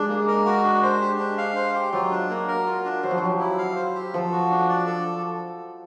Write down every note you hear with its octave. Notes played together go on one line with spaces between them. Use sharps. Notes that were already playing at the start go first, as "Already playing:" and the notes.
Already playing: G#3 D4
A#3
A#4
F#4
D4
C5
G4
D4
F5
C5
G4
F#3 F4
D4
A#3
A#4
F4
D4
F#3 C5
F3
F#3 G4
E4
F5
C5
G4
F3 A4
F#4
D4
D5
A4